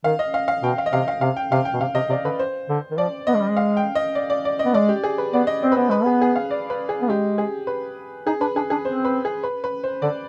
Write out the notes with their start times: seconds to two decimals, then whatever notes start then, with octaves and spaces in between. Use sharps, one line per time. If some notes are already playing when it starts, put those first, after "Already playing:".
0.04 D#3 F5
0.19 D#5
0.34 F5
0.48 F5
0.63 B2 G5
0.78 F5
0.86 D#5
0.93 C3 F5
1.08 F5
1.21 C3 F5
1.36 G5
1.52 C3 F5
1.65 G5
1.73 B2
1.81 C3 F5
1.95 C3 D#5
2.09 C3 D5
2.24 D3 B4
2.39 C5
2.69 D3
2.91 D#3
2.97 F3 D5
3.27 B3 D#5
3.34 G#3
3.41 G3
3.49 G#3
3.57 F5
3.77 G5
3.95 D#5
4.15 D5
4.30 D5
4.45 D5
4.59 D#5
4.65 B3
4.74 G#3 D5
4.89 G4
5.04 G#4
5.18 B4
5.33 B3 D5
5.47 D#5
5.62 C4 D5
5.72 B4
5.76 B3 C5
5.89 G#3 B4
6.03 B3 G#4
6.22 G#4
6.36 F5
6.51 D5
6.70 B4
6.89 G#4
7.01 B3
7.09 G#3 G4
7.38 G#4
7.67 B4
8.27 D#4 G#4
8.40 D4 B4
8.55 D4 G#4
8.70 D4 G#4
8.85 C4 C5
9.05 B4
9.25 G#4
9.43 B4
9.64 B4
9.84 C5
10.02 D3 D5